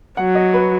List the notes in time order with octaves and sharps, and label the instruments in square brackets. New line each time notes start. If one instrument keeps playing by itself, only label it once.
[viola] F#3 [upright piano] F#5
[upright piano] D#5
B4